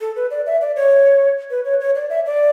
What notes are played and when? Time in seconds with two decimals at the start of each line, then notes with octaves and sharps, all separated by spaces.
0.01 A4
0.16 B4
0.31 D5
0.46 E5
0.61 D5
0.76 C#5
1.50 B4
1.65 C#5
1.80 C#5
1.95 D5
2.10 E5
2.26 D5